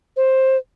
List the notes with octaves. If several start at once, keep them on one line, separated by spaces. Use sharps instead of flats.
C5